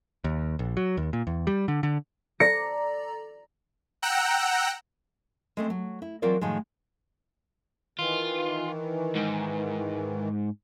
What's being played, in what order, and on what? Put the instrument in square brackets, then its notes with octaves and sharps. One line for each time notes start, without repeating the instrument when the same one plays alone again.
[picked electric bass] D#2
A#1
F#3
D#2
A#2
E2
G3
D3
D3
[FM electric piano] A4 D5 A#5 [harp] A#6 C#7
[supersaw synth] F#5 G5 A#5 E6 F#6
[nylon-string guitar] G#3 A3 C4
F#3
E4
E3 F#3 C4 F4 A#4 D5
A2 D#3 F3 F#3 G#3
[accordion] D#3 E3 [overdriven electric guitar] F4
[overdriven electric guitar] G#2